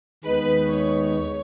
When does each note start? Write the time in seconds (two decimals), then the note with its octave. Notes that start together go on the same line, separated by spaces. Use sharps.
0.24 D#2 D#3 G#3 B3 D#4 B4
0.70 C#5